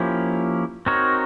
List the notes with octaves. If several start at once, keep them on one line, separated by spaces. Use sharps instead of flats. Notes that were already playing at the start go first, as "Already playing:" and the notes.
Already playing: F3 A#3 C#4 E4 G4
C4 D#4 F#4 A#4 C#5